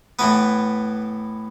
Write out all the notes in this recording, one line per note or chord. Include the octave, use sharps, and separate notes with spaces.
A2 E3 B3 B4